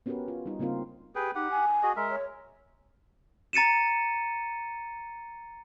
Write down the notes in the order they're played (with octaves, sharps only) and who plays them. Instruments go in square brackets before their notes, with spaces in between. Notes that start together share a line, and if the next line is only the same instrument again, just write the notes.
[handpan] B3 C#4 F#4 G4 A#4 B4
F4
G3 D#4
C#3 A#3 C4 F4 A#4
[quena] G4 [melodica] G#4 B4 G5
[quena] D#4 [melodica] G4 F#5
[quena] G#5
[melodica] F#4 G#4 D#5
G#3 A#4 E5
[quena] C#5
[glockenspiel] A#5 A6 C#7 D#7 E7